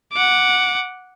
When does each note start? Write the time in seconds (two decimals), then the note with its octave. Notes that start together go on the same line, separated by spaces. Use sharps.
0.12 F#5 D6